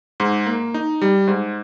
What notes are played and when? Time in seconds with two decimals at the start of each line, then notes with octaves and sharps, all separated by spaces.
0.20 G#2
0.46 A#3
0.74 D#4
1.02 G3
1.27 G#2